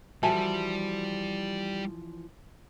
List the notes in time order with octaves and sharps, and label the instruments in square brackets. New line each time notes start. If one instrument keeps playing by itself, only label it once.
[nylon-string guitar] E3 F3 F#4 [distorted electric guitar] G3 [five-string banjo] A4 E5 G#5